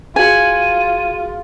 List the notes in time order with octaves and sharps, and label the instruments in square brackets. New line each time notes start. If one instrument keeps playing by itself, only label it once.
[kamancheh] F4 [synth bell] F#4 G#4 [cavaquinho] G#5 [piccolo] D#7